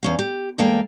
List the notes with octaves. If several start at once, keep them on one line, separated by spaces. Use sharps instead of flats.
E2 C#4 F5
G4
E2 G#3 A#3 A4 F5 G5